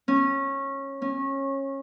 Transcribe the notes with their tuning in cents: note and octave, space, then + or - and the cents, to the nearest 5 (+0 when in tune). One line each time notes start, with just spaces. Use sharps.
C#4 -20
C#4 -25